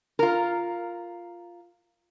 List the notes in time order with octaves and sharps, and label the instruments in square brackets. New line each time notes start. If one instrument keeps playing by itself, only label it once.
[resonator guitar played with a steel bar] F4 A#4